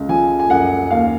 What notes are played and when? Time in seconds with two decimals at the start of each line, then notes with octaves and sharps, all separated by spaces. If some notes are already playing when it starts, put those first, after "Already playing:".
Already playing: C#2
0.09 F3 G#5
0.39 G#5
0.50 F#2 F#5
0.91 D#2 F5